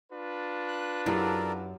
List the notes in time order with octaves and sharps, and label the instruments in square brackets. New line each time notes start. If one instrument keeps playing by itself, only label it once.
[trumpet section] D4 F4 B4
[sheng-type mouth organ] F#6
[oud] F#2 [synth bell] E4 G4 [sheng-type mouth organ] A4 A#4 D5